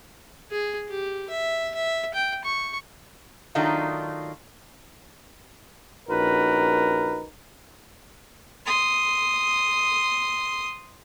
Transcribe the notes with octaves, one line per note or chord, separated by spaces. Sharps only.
G#4
G4
E5
E5
G5
C#6
D#3 F#3 A3 D4 D#4 F4
A#1 C#4 D#4 F#4 A#4 B4
C6 D#6